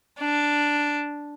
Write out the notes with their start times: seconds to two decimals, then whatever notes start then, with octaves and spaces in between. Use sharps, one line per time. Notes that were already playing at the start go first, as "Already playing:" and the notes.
0.19 D4